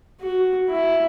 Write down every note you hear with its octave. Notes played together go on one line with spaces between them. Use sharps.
F#4
E4